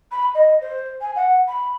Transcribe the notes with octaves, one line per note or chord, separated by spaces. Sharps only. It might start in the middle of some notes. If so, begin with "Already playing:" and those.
B5
D#5
C5
G#5
F#5
B5